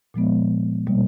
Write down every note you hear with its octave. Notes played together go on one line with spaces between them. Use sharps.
A#2 F3 G#3 B3
B2 G3 A#3